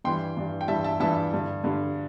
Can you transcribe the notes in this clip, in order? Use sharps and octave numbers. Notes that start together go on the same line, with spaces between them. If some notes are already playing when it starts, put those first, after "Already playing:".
G2 E3 G3 G5 C6
G2 E3 G3
G5
G2 E3 G3 E5 A5
E5 A5
G2 E3 G3 E5 A5
G2 D3 G3
G2 D3 G3